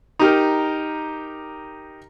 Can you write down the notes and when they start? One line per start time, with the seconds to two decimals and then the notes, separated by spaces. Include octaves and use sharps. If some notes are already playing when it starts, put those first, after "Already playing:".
0.19 D#4 G4 A#4